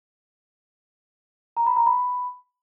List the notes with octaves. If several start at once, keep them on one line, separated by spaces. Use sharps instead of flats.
A#5
B5
A#5
B5